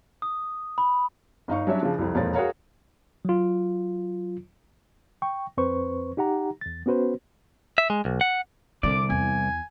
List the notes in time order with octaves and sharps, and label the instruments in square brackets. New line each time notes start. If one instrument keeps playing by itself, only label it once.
[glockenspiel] D#6
B5
[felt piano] G1 D#4 F5 C#6
F#3 G3 C#4 D4 C#5 E5
C#3 F3 D4
C2 F2
E1 F2 A#2 A#4 C#5 A6
F#4 G#4 A#4 C#5 F5 A#5
[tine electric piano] F#3 F4
[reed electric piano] G5 C#6
F2 C4 B4 C5 C#6
D#4 G4 F#5 A#5
E2 A6
B3 C#4 F#4 B4 C5
[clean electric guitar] E5
G#3
B1
F#5
[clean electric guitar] C2 D5 [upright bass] D3 C4 [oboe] D6
[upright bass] E2 [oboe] G#5